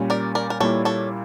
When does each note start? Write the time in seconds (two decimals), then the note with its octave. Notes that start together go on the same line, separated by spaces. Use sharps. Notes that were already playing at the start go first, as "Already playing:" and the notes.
Already playing: A#2 G3 C#4
0.10 A#4 D5
0.35 A#4 D5
0.50 A#4
0.60 A#2 G3 A#3 E4 A4 C#5
0.85 A4 C#5